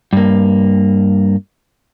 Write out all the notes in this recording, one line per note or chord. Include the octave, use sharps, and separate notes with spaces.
G2 A#3